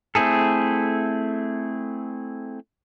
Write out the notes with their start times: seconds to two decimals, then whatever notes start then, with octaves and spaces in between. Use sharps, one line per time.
0.15 A3 C4 E4 G#4 A4